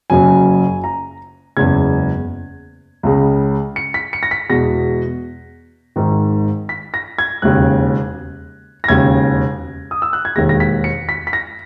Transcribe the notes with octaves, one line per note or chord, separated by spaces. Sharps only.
F#1 F#2 C#3 F#3 G#5
A#5
F#1 E2 C#3 G#3 G#6
C#2 C#3 G#3
C#7
B6
C#7
A#6
B6
E2 B2 G#3 A#6
G#1 G#2 D#3
B6
A#6
G#6
E1 D#2 C#3 F#6
A#6
E1 D#2 C#3 G#6
D#6
E6
F#6
G#6
E1 D#2 D#3 G#3 A#6
A#6
B6
C#7
B6
B6
A#6